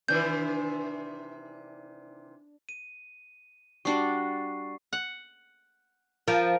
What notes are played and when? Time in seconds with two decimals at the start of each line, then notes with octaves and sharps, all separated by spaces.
0.08 C3 D#3 E3 D4 G6
2.69 D#7
3.85 G3 D4 F#4 C#6 C7
4.93 F#5
6.28 F3 A#4